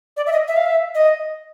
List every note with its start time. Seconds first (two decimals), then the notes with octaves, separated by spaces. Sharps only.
0.17 D5
0.27 E5
0.32 D#5
0.48 E5
0.56 F5
0.66 E5
0.95 D#5